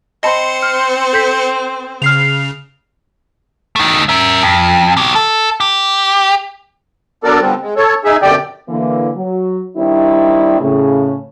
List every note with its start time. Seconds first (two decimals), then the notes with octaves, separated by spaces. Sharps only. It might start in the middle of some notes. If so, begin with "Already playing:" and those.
0.23 C4 C5 D#5 A5 B5 C6 C#7
0.63 F6
1.13 A4 G6 B6
2.02 C#3 F6 C7 F7
3.76 A3 D#4
4.09 A#4 E5
4.42 F2
4.97 B2 G4
5.15 A4
5.60 G4
7.24 F#3 B3 D4 A4 A#4 D5
7.41 D3 F3 G3 B3 C4
7.62 G#3
7.76 A4 C#5
8.05 D#4 G#4 E5
8.22 F#2 B2 D3 G4 D5 G5
8.69 D3 E3 A#3
9.16 F#3
9.77 D#3 G3 C4 D4 E4
10.61 A2 C#3